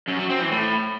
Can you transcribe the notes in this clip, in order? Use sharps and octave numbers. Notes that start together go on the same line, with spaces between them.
F#2
F#3
C4
E3
A2